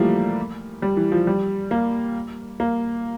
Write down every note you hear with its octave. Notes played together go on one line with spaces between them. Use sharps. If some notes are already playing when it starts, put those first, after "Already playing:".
Already playing: E3 F3 G3 A3 A#3
G3
E3
F3
G3
A#3
A#3